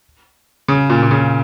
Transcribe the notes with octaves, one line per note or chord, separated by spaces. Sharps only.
C#3
A#2
A#2
C#3